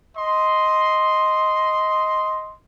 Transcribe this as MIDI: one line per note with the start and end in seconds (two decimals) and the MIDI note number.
0.17 2.57 75
0.17 2.57 84